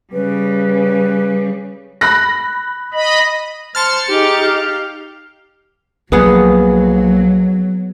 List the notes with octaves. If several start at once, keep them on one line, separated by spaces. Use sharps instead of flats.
C#3 G3 B4
B5 F#6 A#6
D#5 B5
C5 A5 C6 F6 A6 C#7
D#4 G4 G#4
G4 F5
B1 F3 F#3 A#3 B3 G#4 F#5